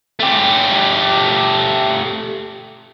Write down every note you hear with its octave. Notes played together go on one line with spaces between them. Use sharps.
A3 G4